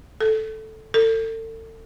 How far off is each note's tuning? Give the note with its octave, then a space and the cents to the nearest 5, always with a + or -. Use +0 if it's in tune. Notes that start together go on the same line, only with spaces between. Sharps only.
A4 -5
A4 +35